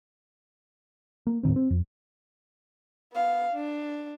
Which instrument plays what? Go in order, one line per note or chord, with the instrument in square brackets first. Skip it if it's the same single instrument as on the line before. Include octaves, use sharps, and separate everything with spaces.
[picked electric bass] A#3
D#1 A2 D#3 C4
C4
F2
[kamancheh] B3 F5
D4